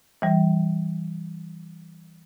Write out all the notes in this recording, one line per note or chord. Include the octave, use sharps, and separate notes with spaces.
E3 G3